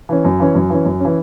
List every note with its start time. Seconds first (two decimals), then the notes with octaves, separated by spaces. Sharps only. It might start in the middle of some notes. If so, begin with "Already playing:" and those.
0.09 E3 C#4
0.25 F#2
0.40 E3 C#4
0.55 F#2
0.70 E3 C#4
0.85 F#2
1.00 E3 C#4